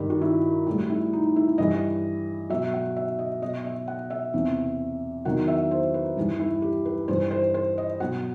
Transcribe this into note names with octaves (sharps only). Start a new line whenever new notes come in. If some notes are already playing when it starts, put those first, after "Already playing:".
Already playing: G2 D#3 G3 G4
F#4
E4
A2 G3 F#4
E4
D#4
E4
G2 E3 G3 D#5
B2 F#3 E5
F#5
E5
D#5
B2 F#3 D#5
E5
F#5
E5
E2 C3 E3
E2 D#3 F#3 F#5
E5
C5
B4
G2 E3 G3 G4
E4
G4
B4
G2 E3 G3 C5
C5
C5
D#5
B2 F#3 F#5